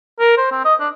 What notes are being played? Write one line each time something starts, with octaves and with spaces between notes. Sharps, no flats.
A#4
C5
C4
D#5
D4